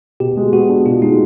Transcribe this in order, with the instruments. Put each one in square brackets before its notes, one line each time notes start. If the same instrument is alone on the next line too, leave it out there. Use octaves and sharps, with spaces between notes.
[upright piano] B2 [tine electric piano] G4
[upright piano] G#3
[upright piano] B3 [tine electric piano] F#4
[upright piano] D4
[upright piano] B2 [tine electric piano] F4
[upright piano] G#3 [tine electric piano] D#4